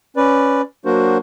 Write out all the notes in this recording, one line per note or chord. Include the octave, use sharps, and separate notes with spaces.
C#4 B4 D5
F#3 A#3 D4 F#4 A#4 C5